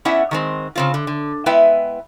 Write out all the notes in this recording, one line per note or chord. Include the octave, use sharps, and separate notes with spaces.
B3 C#4 E4 D5 E5 F#5
D#3 G#3 C4
C#3 C4 F4
D3
D3
G#3 B3 E4 B4 E5 G5